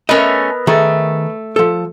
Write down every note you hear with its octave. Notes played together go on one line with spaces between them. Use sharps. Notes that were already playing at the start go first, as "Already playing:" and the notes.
A3 B3 C#4 A#4 D#5 E6
D#3 A3 G#4 A4
F3 A4